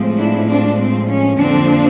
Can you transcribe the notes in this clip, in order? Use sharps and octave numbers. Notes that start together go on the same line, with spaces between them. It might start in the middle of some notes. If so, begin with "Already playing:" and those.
Already playing: A2 F3 G#3 C4
D4 E4
C4 D4
C4
C#4
F2 D3 F3 A#3 C4 D4